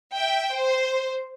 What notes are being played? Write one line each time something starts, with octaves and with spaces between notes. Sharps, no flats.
E5 G5
C5